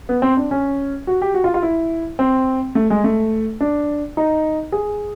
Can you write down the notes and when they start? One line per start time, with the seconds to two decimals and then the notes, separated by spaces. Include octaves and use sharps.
0.09 B3
0.22 C4
0.37 D4
0.51 C#4
1.07 F#4
1.22 G4
1.34 F#4
1.44 F4
1.54 F4
1.63 E4
2.19 C4
2.75 A3
2.90 G#3
3.04 A3
3.61 D4
4.17 D#4
4.72 G#4